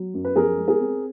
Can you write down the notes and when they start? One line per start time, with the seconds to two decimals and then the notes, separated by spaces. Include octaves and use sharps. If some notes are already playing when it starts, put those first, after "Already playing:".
Already playing: F#3
0.14 F#2
0.25 B4
0.36 F3 G#4 A#4
0.57 G#3
0.68 G#4 A#4
0.79 C4